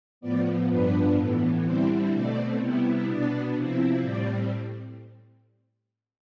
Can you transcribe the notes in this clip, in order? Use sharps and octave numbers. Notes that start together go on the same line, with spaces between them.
A2 F3 B3 D5
G2 F3 B3 D4 B4
A2 E3 B3
D3 G3 C4 E4 C5
B2 A3 C4 D5
C3 G3 B3 E4
B2 B3 D4 D5
C3 F3 C4 E4
A2 G3 C4 D5